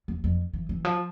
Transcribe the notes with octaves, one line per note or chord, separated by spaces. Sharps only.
E2
F2
E3
E3
F3